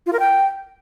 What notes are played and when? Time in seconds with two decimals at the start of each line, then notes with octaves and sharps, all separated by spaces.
0.06 F4
0.13 A#4
0.19 G5